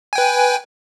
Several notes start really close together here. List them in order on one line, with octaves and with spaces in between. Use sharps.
G#5 G5 B4